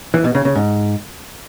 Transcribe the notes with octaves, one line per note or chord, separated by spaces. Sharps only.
E3
B2
C#3
C#3
G#2